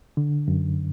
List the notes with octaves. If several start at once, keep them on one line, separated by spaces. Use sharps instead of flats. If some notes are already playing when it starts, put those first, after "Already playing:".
D3
F#2